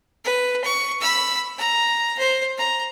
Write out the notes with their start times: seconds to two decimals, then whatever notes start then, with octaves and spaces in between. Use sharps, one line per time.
0.25 B4
0.64 C#6
1.01 B5 E6
1.58 A#5
2.19 C5
2.58 A#5